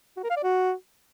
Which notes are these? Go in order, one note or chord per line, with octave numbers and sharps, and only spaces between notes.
F#4
A#4
F5
D5
F#4